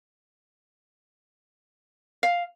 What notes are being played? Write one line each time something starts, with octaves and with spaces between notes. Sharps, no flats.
F5